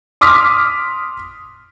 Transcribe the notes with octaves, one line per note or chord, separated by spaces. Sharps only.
C6 D6 D#6 F6 B6